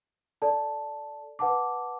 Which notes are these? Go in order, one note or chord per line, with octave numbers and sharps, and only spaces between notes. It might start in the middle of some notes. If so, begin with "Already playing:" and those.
A4 D5 A5
B4 F#5 A5 D6